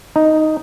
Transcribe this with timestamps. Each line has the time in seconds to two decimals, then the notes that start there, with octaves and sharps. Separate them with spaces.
0.16 D#4